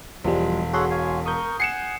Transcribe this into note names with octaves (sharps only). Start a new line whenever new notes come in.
E1 F3 G3 G#3
F#4 G#4 A4 C#5 F#5 C6
C#5 F5 G#5
A#4 C#6 D#6 G6
F#5 G#5 C7 C#7 E7